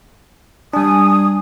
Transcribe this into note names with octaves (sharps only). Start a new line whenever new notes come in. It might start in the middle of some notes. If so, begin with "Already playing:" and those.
G3 D4 G#5 D#6